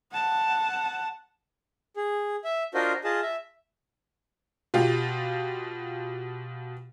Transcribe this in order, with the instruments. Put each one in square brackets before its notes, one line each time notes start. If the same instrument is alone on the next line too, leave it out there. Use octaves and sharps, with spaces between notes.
[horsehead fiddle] F#5 A5
[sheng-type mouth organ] G#4
E5
D4 F4 F#4 A#4 C5 D#5
F4 G#4 D#5 A5
E5
[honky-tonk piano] B2 F4 G4